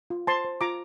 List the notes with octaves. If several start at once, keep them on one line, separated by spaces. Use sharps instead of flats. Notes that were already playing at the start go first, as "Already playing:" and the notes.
F4
C5 A5 C6
C5
F4 A#5 D6